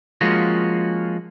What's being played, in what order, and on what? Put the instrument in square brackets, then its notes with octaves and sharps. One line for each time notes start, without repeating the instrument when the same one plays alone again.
[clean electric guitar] F3 G#3 A#3 C#4 F4 F#4